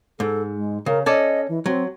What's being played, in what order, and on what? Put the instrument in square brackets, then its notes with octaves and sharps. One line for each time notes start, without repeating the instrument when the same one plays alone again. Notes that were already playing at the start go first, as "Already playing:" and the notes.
[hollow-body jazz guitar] G#2 [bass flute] A4
[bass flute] G#3
[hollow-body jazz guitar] C#3 [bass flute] A#4
[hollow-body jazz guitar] C#4 A4 D5 [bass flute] D#5
[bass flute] E3
[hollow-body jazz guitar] F#3 [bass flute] C4